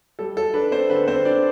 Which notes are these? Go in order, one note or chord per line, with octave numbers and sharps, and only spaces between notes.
G3 A4
A4
D4 B4
C4 C5
D3 B4
C4 C5
D4 D5